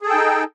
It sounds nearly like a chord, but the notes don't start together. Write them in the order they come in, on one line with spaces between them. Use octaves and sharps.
G#4 A4 G5 D#4